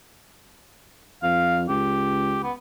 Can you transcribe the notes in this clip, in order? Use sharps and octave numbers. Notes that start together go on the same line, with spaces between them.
F2 F5
C#2 G4
B3